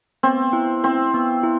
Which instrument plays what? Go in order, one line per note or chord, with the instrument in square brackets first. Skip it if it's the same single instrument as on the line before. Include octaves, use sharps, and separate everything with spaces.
[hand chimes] B3 [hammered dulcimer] C4
[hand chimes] E4
[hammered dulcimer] C4 [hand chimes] E4
[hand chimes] B3
E4